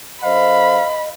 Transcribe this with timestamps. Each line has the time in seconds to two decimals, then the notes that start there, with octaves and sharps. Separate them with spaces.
0.23 F#2 A4 C5 D#5 F5 B5